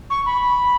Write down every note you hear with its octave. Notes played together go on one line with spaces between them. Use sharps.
C#6
B5